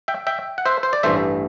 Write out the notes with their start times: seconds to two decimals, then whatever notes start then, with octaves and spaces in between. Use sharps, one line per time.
0.08 E5 G5
0.27 E5 G5
0.58 F#5
0.66 C5 E5
0.83 C5
0.93 D5
1.03 A1 G2 E3 A3 C5 E5